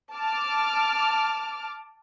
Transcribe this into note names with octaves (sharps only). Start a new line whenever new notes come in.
A5 D6 F6